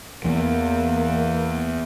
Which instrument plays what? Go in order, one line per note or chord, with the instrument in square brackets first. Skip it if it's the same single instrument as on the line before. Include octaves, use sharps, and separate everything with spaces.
[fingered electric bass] E2 E3 [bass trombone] A#3